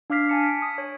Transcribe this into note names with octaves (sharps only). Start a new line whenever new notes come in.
D4 F5 D6 F6 B6 C7
G#5 A5 C#7
B6 C#7 D7
D#6
C#5